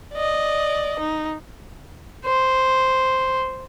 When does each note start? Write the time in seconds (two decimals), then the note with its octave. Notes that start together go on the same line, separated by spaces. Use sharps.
0.14 D5 D#5
0.99 D#4
2.25 C5